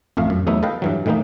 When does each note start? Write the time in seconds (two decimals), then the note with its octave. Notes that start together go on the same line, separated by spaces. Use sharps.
0.17 A1 F2 A3 F5
0.30 F#2
0.47 E2 F#3 A3 B3 D#4 E5
0.63 A4 B4 D#5 F5 G5
0.82 G2 E3 F#3
1.06 A2 D#3 E3 A#3 D#4